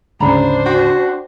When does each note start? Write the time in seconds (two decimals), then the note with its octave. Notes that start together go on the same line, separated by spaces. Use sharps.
0.20 D2 G#2 C#3 D4 C5 D5 A#5 B5
0.66 F#4 G5